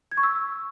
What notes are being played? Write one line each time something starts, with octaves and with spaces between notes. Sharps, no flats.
G#6
C#6
E6